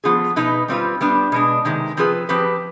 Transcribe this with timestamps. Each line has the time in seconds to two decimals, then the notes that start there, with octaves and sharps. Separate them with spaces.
0.04 F3 B3 F4 G#4
0.36 B2 B3 D#4 B4
0.68 G3 C4 F4 B4
1.01 G3 B3 D4
1.32 B2 G#3 D4
1.65 C3 D#3 G#3
1.97 F3 C4 F4 G#4 B4
2.29 F3 C4 G4 B4